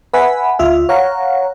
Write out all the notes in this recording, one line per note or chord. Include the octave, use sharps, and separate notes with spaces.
B4 E5 F#5 G#5 B5
D2 F4 E5
C#5 F5 F#5 A#5